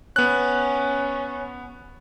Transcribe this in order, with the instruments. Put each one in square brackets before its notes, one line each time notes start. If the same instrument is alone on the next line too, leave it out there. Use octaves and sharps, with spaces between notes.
[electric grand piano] B3 F#6 [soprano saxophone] C#4